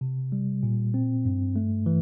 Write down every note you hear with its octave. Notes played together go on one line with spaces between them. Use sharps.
C3
G3
A#2
C4
G2
A3
E3